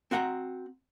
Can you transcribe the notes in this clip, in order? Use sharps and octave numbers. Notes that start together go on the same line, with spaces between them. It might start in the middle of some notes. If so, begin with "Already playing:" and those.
C4 F#4 F#5 G#5 A#5